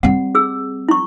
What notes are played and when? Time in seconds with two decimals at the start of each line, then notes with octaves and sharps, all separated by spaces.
0.03 G3 C4 F#5
0.35 G#4 E6
0.89 E4 C#6